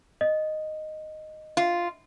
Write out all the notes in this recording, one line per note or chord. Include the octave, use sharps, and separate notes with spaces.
D#5
F4